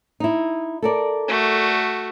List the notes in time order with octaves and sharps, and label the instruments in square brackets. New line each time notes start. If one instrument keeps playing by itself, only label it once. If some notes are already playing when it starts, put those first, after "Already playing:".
[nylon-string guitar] D#4 E4
A4 A#4 D5
[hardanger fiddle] A3 F#4